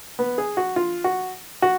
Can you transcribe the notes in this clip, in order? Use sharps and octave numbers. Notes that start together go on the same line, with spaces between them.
B3
G#4
F#4
F4
F#4
F#4